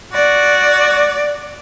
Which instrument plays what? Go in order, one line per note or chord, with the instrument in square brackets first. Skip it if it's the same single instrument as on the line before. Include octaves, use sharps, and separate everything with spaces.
[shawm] F#4 [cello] D5